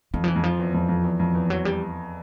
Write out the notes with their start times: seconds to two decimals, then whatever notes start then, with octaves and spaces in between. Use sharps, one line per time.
0.14 F2 E3
0.24 F3
0.28 E3
0.36 F2
0.44 F3
0.59 E2
0.74 F2
0.89 F2
1.04 E2
1.20 F2
1.35 E2
1.50 F#3
1.65 G3